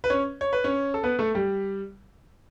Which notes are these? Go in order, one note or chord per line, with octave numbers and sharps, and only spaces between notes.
B4
C#4 C#5
C#5
B4
C#4 C#5
A4
B3 B4
A3 A4
G3 G4